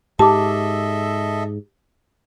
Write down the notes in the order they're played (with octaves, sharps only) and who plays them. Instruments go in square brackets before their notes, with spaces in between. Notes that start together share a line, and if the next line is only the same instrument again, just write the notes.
[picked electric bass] G#2 [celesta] G4 D6 [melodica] A4 D#5 E5 [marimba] A5